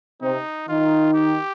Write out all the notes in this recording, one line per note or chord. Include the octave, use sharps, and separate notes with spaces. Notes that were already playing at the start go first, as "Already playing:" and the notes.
C3 C4 D#4
D#3 D#4 F4
G4